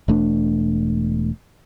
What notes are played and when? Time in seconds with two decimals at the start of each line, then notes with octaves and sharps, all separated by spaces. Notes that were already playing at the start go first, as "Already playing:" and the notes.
0.08 E1 A3 D4